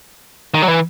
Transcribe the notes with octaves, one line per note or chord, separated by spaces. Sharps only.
D#3
F#3
E3